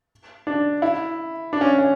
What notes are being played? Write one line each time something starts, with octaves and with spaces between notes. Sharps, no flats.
D4
E4
D4
C#4
C#4